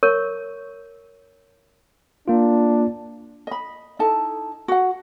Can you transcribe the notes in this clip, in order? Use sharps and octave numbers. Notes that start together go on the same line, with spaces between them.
A#4 C#5 C#6
A#3 D4 F4
D#5 B5
D#4 E4 A4 A5
F#4 F#5